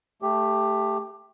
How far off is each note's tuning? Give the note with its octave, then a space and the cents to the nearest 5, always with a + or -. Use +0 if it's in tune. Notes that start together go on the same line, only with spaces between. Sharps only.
A3 +0 G4 +15